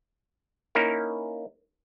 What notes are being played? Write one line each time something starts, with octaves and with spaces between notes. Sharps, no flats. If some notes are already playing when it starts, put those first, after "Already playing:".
A#3 C#4 D#4 E4 A#4